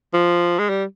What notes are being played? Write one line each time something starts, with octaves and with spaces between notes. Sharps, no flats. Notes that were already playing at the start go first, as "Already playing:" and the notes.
F3
G#3
G3